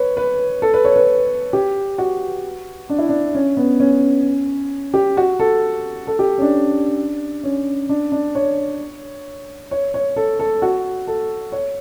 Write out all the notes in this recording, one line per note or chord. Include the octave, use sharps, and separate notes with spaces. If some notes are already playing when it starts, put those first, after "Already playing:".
Already playing: B4 C#5
B4
A4
B4
C#5
B4
G4
F#4
D4
E4
D4
C#4
B3
C#4
G4
F#4
A4
A4
G4
C#4
D4
C#4
D4
D4
C#5
C#5
C#5
A4
A4
F#4
A4
C#5